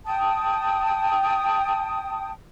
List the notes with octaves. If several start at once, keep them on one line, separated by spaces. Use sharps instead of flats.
G5 A5 D#6